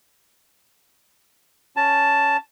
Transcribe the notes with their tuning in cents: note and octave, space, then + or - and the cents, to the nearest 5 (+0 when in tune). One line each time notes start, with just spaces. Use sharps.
C#4 +10 A5 +0